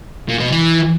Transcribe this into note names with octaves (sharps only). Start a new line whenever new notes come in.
A#2
B2
E3